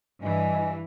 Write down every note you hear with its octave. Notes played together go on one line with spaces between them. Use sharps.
G2 E3 D5 D#5 G#5